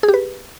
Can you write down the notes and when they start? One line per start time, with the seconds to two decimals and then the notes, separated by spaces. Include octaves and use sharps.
0.03 G#4
0.08 G4
0.14 B4